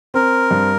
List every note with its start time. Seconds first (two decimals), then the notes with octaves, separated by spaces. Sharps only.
0.14 C4 A#4
0.51 G2